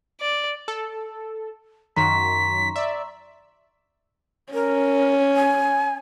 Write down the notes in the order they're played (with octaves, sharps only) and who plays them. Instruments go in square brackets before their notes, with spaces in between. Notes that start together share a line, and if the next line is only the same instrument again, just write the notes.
[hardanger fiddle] D5
[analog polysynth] A4
[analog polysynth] F#2 D#3 F#3 [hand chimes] A#5 C6 C#6 [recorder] B6
[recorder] D5 [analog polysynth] E5
[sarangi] C#4 [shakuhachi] A#4
[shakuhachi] G#5